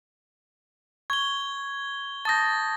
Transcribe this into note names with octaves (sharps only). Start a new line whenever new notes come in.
C#6 G#6 G7
A5 D#6 G6 A6 A#6